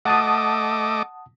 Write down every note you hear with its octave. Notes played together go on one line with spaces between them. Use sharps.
A3 D#5 F#5 A5 D6 D#6